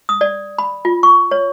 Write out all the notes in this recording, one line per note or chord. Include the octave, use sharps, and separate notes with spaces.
D#6
D5
B5
F4
C#6
C#5